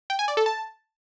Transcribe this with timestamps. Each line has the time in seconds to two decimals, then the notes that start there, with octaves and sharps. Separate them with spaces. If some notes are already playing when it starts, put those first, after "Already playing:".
0.10 G5
0.19 G#5
0.28 D5
0.37 A4
0.46 A5